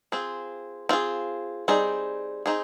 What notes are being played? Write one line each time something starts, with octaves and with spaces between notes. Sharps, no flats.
C4 F4 G#4
C4 F4 G#4
G3 C4 D#4 G#4
C4 D#4 G#4